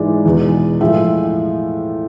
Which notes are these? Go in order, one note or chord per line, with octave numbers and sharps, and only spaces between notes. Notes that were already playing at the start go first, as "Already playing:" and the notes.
Already playing: G#2 E3 G#3 D5
E2 B2 G#3
A2 F3 G#3 E5